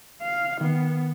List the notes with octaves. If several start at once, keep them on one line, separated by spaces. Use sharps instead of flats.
F5
D#3 B3